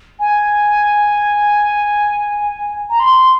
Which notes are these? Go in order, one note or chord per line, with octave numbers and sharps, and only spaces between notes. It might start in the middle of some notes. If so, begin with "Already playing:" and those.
G#5
A#5
C6